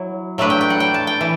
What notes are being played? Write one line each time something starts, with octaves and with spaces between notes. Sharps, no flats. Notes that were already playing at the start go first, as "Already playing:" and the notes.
Already playing: F#3 E4
F#3 A3 D4 B4
G5
G5
F#5
G5
A5
G5
E3